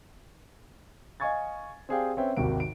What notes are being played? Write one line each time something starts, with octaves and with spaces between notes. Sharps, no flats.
D#5 F5 G#5 C#6 G#6 A6
C4 G4 G#4 D5 F5 G5
C4 C#4 B4 C#5 E5 G5
G#1 D#2 C3 F#4 D7
D7